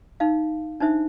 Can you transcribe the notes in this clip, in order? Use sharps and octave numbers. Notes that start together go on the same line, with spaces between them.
D#4 F5
D4 D#4 C5 E5